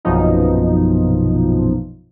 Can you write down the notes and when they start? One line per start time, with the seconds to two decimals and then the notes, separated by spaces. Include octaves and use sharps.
0.05 A#1 F#2 B2 F3 D#4